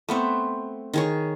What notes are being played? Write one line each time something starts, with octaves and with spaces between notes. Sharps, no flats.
A3 B3 C4
D#3 G#4 C#5